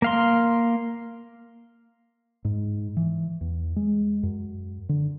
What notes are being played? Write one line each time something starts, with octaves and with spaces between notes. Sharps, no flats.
A#3 F5 C6
G#2
E3
E2
G#3
F#2
D3